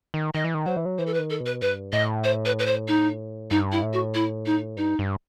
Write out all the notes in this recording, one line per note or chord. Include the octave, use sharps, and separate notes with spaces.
D#3
D#3 D#5
E3
D#3
F#3 C5
E3
F#3
E3 C5
A4
B4
D#3
A4
B2
B4
G2 B4
A2 D#5
C5
B4
B4
C5
D#4
G2 D#4
E4
A2
F#4
E4
D#4
G2 D#4
G2